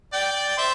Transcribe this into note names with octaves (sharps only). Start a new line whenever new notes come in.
D5 G5
G5
C5 E5